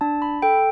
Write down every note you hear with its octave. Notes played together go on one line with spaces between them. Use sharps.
D4 A5
B5
A4 G5